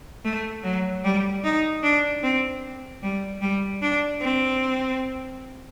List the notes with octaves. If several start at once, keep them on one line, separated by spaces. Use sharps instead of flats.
A3
F#3
G3
D#4
D4
C4
G3
G3
D4
C4